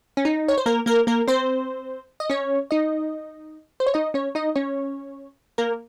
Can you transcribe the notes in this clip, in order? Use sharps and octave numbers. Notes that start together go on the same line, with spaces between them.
C#4
D#4
C#5
C5
A#3 A#4
A#3 A#4
A#3 A#4
C4 C5
D#5
C#4 C#5
D#4 D#5
C5
C#5
D#4 D#5
C#4 C#5
D#4 D#5
C#4 C#5
A#3 A#4